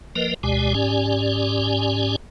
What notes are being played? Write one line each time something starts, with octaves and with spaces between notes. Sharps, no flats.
F3 A#3 A#4 B4 D#5
D2 B2 G#3 G4 D5 G#5
G#2 C#4 G4 D5 G#5